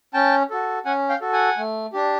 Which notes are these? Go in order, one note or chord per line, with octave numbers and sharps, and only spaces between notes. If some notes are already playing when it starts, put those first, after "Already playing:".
C#4 G5 A5
F#4 A4
C#4 F#5 G#5
F5 G5
F#4 A4
F#5 G#5
A3
D4 G4